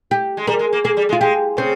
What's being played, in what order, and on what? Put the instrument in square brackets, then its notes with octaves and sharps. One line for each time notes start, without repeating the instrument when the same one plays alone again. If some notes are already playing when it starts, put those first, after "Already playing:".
[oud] G4
[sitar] G#3
[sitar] G3 [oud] A#4
[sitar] G#3
A#3
[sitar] A#3 [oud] G#4
[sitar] G3
G#3
[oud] F4
[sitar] G#3 [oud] G4
[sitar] C#3 [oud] C4